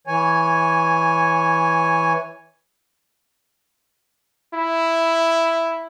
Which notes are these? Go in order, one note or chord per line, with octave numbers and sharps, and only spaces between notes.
E3 C#5 G#5
E4